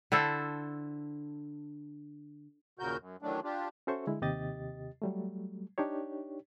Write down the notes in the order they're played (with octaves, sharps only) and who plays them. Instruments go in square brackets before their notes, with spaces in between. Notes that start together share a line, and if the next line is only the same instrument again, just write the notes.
[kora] D3 E4 A4 C5
[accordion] D#2 A#2 C#3 F#4 A#4 G6
F#2
D#3 E3 F#3 A3 D4
D4 F4 G4
[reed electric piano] C#4 F#4 A4 C5 E5 C#6
D3 G#3 E4
D#2 C3 G4 D#5 A6
F#3 G3 A3
D4 D#4 G4 C#5